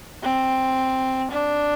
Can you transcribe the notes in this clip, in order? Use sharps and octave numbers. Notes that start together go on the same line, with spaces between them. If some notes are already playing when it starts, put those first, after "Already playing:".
C4
D4